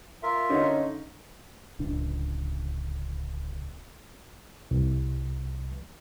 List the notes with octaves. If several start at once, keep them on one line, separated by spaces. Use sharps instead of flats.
F4 A#4 E5
D3 C#4 D#4
D1 C#2 D4
C2